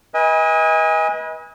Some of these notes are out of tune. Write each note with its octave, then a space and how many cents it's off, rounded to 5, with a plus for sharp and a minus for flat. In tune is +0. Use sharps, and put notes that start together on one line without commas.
B4 -35 D#5 +35 G#5 -25